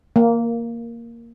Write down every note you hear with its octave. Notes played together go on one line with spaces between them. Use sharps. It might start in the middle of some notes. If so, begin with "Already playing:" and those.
A#3